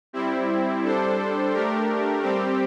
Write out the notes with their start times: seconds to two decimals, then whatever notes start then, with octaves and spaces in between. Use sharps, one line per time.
0.13 G3 C4 E4
0.82 G3 D4 A4 C5
1.53 A3 D4 G4 A#4
2.22 G3 C4 G4